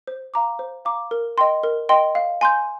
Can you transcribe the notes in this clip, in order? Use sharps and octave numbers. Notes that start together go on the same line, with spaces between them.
C5
F5 A#5 D6
C5
F5 A#5 D6
A#4
D#5 G5 C6
A#4
D#5 G5 C6
F5
G#5 C6 G6